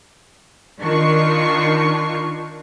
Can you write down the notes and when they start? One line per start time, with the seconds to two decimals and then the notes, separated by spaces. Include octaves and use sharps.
0.81 D#3 D4 D#4 F4 C#6 C7